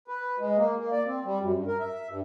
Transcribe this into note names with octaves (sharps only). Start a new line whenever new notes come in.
B4
G#3
A#3
A#3
D5
C4
G3
F#2
G2
A#4
E5
G2